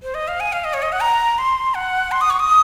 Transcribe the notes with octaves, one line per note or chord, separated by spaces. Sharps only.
C5
D#5
F5
G#5
F5
D#5
C#5
D#5
F#5
A#5
C6
F#5
C6
D#6
C#6
D#6